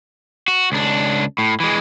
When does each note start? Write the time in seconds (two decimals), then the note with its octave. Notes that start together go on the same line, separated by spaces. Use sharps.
0.48 F#4
0.72 C#2 D4
1.38 A2
1.60 E3 G#3